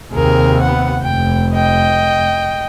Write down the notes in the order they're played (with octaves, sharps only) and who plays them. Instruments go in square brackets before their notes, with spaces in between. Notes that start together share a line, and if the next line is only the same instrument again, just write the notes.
[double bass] D#2 C3 [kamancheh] G#4 A#4
[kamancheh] B3 F#5
[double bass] F1 [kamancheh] G5
[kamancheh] D#5 G5